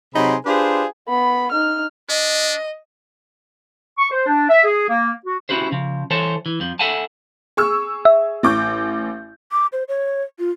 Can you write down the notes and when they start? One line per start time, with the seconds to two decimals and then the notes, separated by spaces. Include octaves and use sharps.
0.15 C3 F#3 D#4 G#4 B5 C6
0.46 D4 F4 G4 G#4 B4 C5
1.09 B3 B5
1.51 D#4 F6
2.09 D4 D#5
3.98 C#6
4.10 C5
4.26 D4
4.48 E5
4.64 G#4
4.88 A#3
5.25 F#4
5.49 C#4 E4 F#4 G4 C5
5.72 C#3 F3
6.11 E3 A4 C5 C#5 A5
6.46 E3
6.60 F2 F3
6.79 A4 E5 F#5 G#5 A5
7.57 G#4 C#6 E6
8.05 E5
8.43 A1 D6 G6
9.52 D6
9.73 C5
9.88 C#5
10.39 F4